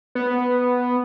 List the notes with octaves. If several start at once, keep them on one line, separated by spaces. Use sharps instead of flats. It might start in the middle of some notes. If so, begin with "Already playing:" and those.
B3